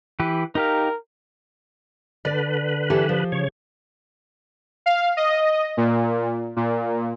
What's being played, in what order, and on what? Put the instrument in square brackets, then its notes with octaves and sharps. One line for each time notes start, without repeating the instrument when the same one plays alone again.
[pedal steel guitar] E3 G4 B4
[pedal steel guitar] D#4 G4 F5 [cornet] A#4
[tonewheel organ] D3 B4 [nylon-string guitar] D5
[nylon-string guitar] E3 G4 A4
F3
[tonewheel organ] C#3 C#5
[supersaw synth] F5
D#5
A#2
A#2